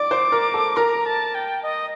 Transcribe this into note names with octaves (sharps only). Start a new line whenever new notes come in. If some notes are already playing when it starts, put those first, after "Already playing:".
Already playing: D5 D6
C5
A#4
A4
A#4 A#5
A5
G5
D#5